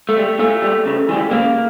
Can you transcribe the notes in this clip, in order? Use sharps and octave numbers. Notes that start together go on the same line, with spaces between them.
A3
G3
A#2 A3
G3
C#3
E3 G3
C#3 A#3